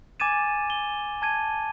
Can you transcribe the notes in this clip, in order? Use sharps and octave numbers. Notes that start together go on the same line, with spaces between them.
G#5 D6 G#6 A6 D#7 E7
G7
A5 G#6 D#7